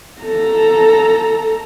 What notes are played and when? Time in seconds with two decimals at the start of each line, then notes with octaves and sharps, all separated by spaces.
0.21 A4 A#5